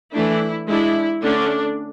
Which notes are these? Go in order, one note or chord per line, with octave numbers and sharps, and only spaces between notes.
E3 A3 D4 E4
G#3 D4 E4
D3 A3 C#4 D4